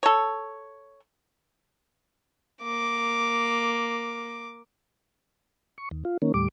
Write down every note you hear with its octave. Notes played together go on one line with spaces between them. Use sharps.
A4 C#5
A#3 D6
C#6
D#2
F4
D#3 A#3 C#4
D#2 A2 G3 D6